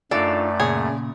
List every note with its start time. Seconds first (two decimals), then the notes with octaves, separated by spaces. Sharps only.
0.11 F#2 A3 D4 D#4 F4 A4 D5
0.60 A#2 C#3 G#4 C#5